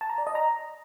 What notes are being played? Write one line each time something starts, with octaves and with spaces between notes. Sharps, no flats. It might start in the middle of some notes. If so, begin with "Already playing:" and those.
A5
A#5
D5
D#5
A#5